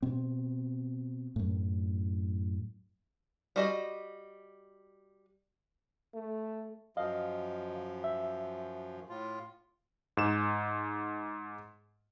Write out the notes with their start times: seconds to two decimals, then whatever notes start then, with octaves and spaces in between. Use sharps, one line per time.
0.02 B2 C4
1.36 F#2 A2
3.56 G3 F#4 D#5
6.14 A3
6.97 F#2 F3 D#5 F5
8.04 E5
9.09 A2 F4
10.17 G#2 E7